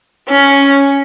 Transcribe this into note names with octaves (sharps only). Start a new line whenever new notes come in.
C#4